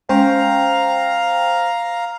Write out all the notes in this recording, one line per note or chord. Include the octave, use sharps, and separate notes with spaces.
G#3 C#4 C5 F5 G5 A#5